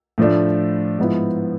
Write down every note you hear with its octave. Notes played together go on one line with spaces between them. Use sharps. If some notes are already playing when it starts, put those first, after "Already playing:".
A2 F3 A3 D4
G#2 F3 B3 E4